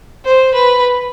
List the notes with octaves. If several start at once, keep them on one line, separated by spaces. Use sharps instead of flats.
C5
B4